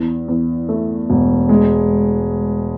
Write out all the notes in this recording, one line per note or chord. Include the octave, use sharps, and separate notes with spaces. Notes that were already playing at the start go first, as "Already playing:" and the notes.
Already playing: E2
E2
A3
E1
G#3